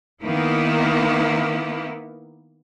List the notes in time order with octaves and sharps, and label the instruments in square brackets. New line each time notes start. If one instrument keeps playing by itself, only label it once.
[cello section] D#3 A#3 B3 E4